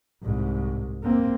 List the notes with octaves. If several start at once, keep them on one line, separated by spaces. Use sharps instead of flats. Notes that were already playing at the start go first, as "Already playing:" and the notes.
C2 G#2
A#3 C4